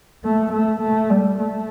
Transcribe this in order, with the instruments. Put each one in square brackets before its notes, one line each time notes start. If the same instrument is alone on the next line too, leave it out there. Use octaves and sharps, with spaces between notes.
[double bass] A3
A3
A3
G3
A3